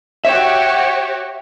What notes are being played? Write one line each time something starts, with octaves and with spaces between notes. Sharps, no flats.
F#4 G4 C#5 E5